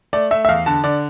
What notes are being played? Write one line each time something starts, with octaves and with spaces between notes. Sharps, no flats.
A3 D5
A3 E5
E5
E2 F5
D3 A5
D3 D5